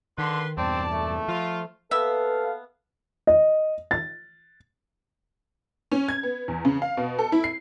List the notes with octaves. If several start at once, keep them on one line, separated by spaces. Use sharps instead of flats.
D3 D#3 B4 C6
E2 G2 B2 C4 D5 A5
A3
F3 F4
A#3 B3 A4 B4 E5 F5
D#5
A6
C#4
G#6
B3
E2
C#3
F5
B2
A4
E4
C7